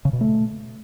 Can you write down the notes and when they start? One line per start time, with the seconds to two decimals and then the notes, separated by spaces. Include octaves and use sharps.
0.05 C#3
0.13 B2
0.21 A3